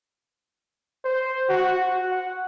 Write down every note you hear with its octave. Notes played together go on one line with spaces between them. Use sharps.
C5
F#4
F#4
F#5